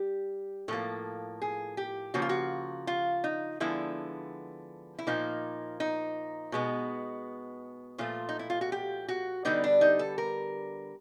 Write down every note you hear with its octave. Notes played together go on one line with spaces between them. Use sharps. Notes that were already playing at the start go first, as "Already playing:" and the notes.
Already playing: G3 G4
A2 F3 A#3 A4
G#4
G4
C#3 F3 A#3 F#4
F4
F#4
F4
D#4
D3 F3 G#3 B3 E4
E4
A#2 F3 A#3 D#4
D#4
B2 G#3 B3
A#2 F3 A3 F4
D#4
E4
F4
F#4
G4
F#4
D3 G3 B3 D#4
D4
D#4
A4
A#4